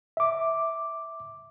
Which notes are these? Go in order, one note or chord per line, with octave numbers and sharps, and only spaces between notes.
E5 D6